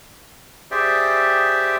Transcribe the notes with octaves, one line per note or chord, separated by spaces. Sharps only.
G4 G#4 C5 D5 E5 G5